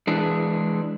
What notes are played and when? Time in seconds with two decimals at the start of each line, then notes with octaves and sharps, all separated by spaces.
0.07 E3 G#3 D4